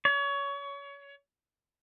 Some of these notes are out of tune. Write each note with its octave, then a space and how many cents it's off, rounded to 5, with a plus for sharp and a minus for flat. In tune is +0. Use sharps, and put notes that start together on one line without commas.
C#5 +25